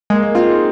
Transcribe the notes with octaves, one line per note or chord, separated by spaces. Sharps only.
G#3 A#3
A#3
C4 F4
D#4